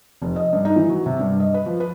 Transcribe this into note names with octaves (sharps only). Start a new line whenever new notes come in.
F1
D#5
G2
D#4
E3
F#3
C3
G2
D#5
B4
F3
B4